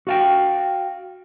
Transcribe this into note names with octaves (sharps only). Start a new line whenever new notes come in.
F#4 F5 G5